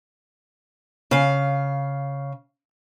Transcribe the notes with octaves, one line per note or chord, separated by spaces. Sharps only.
C#3 F5